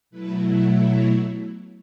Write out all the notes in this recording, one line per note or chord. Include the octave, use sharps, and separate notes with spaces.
B2 F#3 A3 E4 B4
C#5